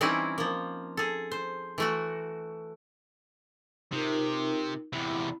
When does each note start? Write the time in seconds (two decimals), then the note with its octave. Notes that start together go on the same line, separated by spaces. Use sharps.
0.01 E3 G3 C4 C#4 D#4 E4
0.38 F3 A#3
0.97 G#4 A4
1.31 C5
1.78 E3 A3 F#4
3.92 C3 D#4 F4 A#4
4.93 E2 C3 C4 E4 B5